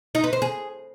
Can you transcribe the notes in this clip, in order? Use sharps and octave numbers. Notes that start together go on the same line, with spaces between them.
D#4
B4
C5
G#4